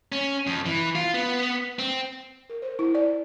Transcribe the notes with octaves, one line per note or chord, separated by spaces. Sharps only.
C#4
F2
E3
F4
B3
C4
A#4
C5
E4
D5